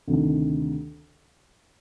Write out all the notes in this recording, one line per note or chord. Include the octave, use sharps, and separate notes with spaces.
D2 C3 D#3